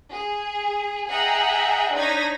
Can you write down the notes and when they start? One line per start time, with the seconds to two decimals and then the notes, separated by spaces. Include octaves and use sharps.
0.13 G#4
1.09 G#4 D#5 E5 F#5 G5 A#5
1.95 D4 D#4 C#5 G#6 A#6 B6